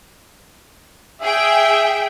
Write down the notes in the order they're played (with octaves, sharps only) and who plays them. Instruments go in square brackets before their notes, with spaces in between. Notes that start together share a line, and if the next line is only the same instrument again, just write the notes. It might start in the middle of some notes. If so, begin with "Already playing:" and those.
[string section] G#4 G5 [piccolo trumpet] E5